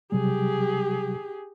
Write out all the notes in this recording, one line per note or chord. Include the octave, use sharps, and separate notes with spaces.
C3 F#3 G3 G4 G#4